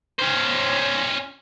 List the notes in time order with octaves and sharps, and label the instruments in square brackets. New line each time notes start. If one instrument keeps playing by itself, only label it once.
[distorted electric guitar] C#4 C5